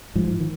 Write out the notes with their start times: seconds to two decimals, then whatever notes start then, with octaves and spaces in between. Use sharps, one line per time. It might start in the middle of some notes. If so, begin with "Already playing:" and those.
0.15 G#2 F3
0.40 D#3